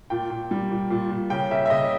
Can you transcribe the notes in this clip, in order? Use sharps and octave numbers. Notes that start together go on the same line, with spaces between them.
A#2 G5
A#2
G3
A#2
A#2
A#2
C#3 G5
C#3 E5
E5
C#3 D#5